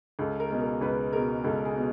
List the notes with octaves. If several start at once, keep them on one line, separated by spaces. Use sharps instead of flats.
C#2 A4
A#4
B2 G#3
A#4
C#2 B4
B2 G#3 A#4
C#2 A4
G#4
B2